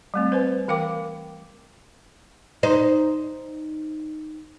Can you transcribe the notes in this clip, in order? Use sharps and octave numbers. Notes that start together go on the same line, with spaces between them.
G3 A3 C4
C4 B4 C5
E3 A#4 F5 G5 D6
D#4 C5